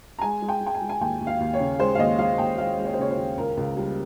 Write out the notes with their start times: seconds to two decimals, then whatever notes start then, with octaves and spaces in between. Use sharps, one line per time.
0.19 A#5
0.21 G#3 G#5
0.42 G#3
0.48 G5
0.61 G#3
0.66 G5
0.75 G#5
0.82 G#3
0.89 G#5
1.01 D#2 G5
1.21 D#2
1.27 F5
1.40 D#2
1.54 C#5
1.60 C#3
1.79 G#3 C5
1.95 F5
1.99 D#2 D#5
2.19 G#3 F5
2.38 D#2 G5
2.58 G#3 F5
2.78 G#3
2.85 C#5
2.94 C5
2.98 C#3 C#5
3.11 C5
3.17 D#2
3.38 C#2 A#4
3.57 C#2
3.77 G3